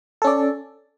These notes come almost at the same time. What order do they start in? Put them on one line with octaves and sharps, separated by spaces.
A4 C#4 D5